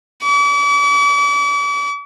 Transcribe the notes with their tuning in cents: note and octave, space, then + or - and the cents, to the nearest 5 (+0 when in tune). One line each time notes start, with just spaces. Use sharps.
D6 -45